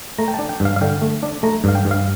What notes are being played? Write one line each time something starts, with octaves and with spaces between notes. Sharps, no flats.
A3 A#5
G5
A5
D4
G5
G2
F5
F5
D3 G5
A3
D4
A3 A#5
G2 F5
G5
G2
F5